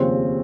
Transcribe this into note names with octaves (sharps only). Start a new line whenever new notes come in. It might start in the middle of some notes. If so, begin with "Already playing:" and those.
Already playing: F1 D#2 C#3 F3 C4